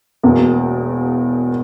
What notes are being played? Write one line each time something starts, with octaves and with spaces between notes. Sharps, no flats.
E1 E2 B2 A#3